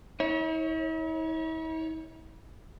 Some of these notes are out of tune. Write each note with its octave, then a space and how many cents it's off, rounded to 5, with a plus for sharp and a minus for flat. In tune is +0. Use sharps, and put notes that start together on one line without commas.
E4 -45 C#5 +0